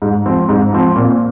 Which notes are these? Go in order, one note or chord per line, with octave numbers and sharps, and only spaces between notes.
G#2
F3 C4
G#2
F3 C4
A#2